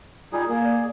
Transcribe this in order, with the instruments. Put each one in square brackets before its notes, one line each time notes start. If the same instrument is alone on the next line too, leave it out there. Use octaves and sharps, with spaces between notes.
[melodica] G3 D#4 G#4 [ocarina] F4
[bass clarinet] A#3 [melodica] G#4 [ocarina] A#4
[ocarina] D5